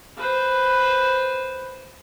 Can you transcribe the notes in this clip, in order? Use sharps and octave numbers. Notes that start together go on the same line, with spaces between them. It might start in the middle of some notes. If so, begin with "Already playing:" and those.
B4 C5